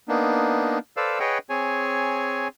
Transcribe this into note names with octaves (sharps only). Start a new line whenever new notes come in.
A#3 B3 D4 D#4
A4 B4 C5 D5 F5 E6
G#4 B4 C#5 D#5 F#5 G5
C4 G#4 C#5 G#5